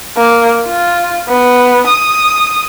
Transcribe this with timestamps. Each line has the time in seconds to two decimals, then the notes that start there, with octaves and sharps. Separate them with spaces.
0.17 A#3
0.67 F4
1.28 B3
1.87 D#6